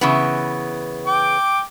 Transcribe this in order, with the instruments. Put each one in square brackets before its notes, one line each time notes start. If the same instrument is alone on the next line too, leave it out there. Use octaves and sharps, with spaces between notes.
[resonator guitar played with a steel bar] C#3 E3 B3
[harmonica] G5 D6